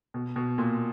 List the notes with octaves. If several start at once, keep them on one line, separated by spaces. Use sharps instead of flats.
B2
B2
A#2